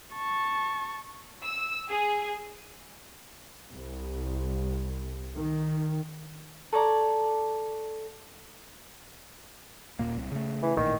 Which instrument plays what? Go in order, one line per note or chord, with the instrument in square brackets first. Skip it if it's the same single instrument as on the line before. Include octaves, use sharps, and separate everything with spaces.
[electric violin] A5 C#6
[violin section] E6
G#4
[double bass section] C2
D#3
[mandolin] A4 C#5 D5 A#5
[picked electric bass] D#1 A#2 A#3
C2
C#3 A3
[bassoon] E3
[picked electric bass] A1 A#2 [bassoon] D#3